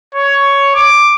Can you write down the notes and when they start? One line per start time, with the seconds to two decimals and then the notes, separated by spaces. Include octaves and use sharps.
0.15 C#5
0.75 D6